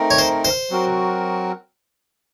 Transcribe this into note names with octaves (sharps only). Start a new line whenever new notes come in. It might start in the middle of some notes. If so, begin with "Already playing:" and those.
Already playing: A3 C4 D#4 A#4
C#5
C5
C5
F#3 C4 F#4 A#4